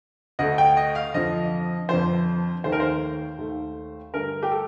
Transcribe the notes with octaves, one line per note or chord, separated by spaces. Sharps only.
D2 D3 A3 D#5
G5
D#5
F5
F2 D3 F3 D#5
F2 D3 F3 C5
D#2 D#3 A3 C5
A#4
C5
D#2 D#3 A3
G2 D3 A3 A#4
G4
A4